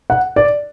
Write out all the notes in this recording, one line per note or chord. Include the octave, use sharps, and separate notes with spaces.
F#5
D5